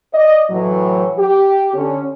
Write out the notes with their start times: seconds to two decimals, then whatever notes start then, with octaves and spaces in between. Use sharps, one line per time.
0.14 D5 D#5
0.51 A2 E3 F#3
1.17 G4
1.74 D3 C#4